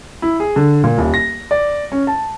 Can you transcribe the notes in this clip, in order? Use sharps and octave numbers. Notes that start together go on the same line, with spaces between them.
E4
G#4
D3
A#2
D#1
A#6
D5
C#4
A5